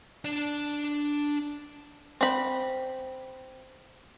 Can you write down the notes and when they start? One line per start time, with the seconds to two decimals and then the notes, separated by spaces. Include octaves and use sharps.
0.25 D4 D5
2.21 C4 B5